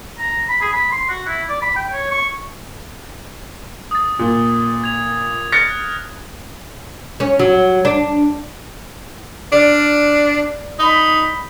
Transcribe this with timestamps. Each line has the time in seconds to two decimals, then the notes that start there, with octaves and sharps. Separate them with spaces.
0.19 A#5
0.49 B5
0.61 G#4
0.73 B5
0.91 C6
1.09 F#4
1.27 E4
1.49 D5
1.62 B5
1.76 G5
1.92 C#5
2.11 C#6
3.91 D#6 A6
4.19 A#2
4.84 G#6 F7
5.52 F6 F#6 A6 A#6 C#7
7.20 C#4
7.39 F#3
7.85 D4
9.52 D4 D5 F6
10.79 D#4 B5